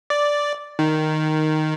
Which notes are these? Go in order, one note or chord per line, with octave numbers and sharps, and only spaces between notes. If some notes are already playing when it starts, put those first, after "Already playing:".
D5
D#3